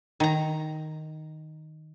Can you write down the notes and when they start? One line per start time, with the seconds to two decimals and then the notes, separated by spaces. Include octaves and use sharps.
0.20 D#3 A#5